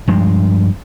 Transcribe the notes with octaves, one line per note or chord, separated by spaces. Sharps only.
G2 F3 G#3